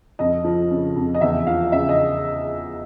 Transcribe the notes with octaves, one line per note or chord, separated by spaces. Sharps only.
F2 D#5
F3
C#3
F2
D#5
E2 E5
F3 F5
C#3 E5
D#5